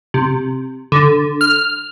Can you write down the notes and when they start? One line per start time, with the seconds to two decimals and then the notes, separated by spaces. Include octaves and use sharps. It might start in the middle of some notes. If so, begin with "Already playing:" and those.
0.14 C3
0.92 D3
1.41 F6